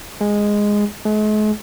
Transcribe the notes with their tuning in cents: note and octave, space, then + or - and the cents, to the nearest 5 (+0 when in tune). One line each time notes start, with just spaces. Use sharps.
G#3 -5
G#3 +45